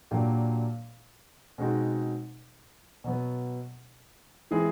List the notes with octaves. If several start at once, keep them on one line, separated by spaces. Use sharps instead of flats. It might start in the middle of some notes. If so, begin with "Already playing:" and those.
A#2 F#3 A#3 D4 G4
B2 G#3 C4 D#4 F#4
B2 F#3 B3
E3 G#3 C4 E4 G#4